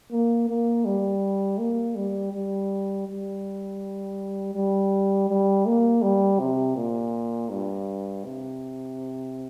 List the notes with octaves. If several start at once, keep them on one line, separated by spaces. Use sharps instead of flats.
A#3
A#3
G3
A#3
G3
G3
G3
G3
G3
A#3
G3
C3
A#2
G2
C3